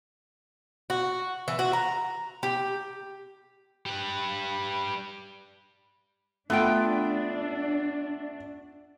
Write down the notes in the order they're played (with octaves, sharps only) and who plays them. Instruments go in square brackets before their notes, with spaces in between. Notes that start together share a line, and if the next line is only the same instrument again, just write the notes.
[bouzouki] F#4
E3
F#4
A#5
G4
[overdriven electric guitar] G3 B4
[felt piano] A3 [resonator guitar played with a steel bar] B3 F4 G5 [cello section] D4